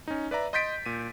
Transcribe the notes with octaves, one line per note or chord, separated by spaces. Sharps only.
C#4 D#4
B4 D5 E5 A#5
D#5 C6 G6 A6 B6 D7
A#2 D#7